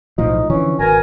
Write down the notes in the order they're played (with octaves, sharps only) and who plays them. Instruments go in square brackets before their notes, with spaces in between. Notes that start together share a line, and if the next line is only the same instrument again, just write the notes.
[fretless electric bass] B1 A2 F3 [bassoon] D#4
[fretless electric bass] D3 E3 F3 [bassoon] C#4
[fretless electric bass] G#1 [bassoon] B2 [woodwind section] A#4 G#5